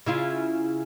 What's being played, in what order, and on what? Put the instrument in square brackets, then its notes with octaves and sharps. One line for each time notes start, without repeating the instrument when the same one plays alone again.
[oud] C#3 E4 F4